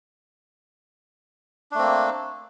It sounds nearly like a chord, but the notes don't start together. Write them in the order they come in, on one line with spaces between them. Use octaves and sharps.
D4 A3 C4 A#3